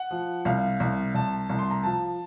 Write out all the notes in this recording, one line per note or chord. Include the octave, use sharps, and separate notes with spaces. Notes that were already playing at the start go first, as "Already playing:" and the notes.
Already playing: F#5
F3
C2 F5
C2
C2 A5
C2
C6
A#5
F3 A5